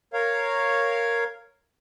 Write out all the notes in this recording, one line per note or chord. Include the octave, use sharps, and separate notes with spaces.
A#4 C#5 F5